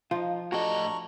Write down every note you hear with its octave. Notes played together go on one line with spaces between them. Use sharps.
F3 D#4 F4
A2 D4 F#4 G4 A4 D#5 A#5 C#6